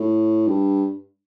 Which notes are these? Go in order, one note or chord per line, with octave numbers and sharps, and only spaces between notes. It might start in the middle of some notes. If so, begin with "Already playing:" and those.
Already playing: A2
G2